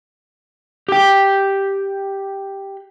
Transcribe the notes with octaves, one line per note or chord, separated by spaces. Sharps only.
G4 G5